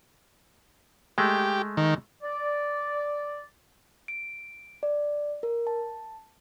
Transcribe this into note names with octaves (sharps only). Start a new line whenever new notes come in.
G#3 A3 G4
D#3
D5
D7
D5
A#4
A5